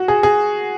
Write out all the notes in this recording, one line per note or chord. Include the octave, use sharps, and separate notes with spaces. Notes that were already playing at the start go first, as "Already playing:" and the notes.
Already playing: F#4
G#4
G#4